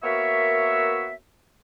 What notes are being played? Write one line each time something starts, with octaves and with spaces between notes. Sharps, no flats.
A#3 B3 F#4 A#4 C#5 E5